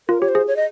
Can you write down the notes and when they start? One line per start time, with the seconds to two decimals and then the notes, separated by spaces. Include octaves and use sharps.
0.09 F4 A#4
0.21 G4 C#5
0.28 C5
0.35 G#4
0.48 C#5
0.56 D#5